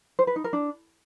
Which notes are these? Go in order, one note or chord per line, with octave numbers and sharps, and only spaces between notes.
C5
B4
D#4
A#4
D4